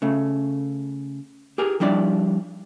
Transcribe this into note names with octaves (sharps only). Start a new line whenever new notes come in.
C#3 A3
G4 G#4 A#4
F3 G3 D4 E4 D5